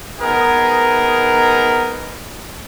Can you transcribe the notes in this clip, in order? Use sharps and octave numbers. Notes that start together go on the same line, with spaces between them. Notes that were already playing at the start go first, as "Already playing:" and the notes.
B3 D#4 G#4 A#4